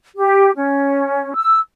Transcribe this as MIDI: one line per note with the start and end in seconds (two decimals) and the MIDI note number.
0.17 0.51 67
0.55 1.33 61
1.35 1.59 88